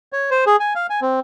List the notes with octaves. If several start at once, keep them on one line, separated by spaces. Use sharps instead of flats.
C#5
C5
G#4
G#5
F5
G#5
C4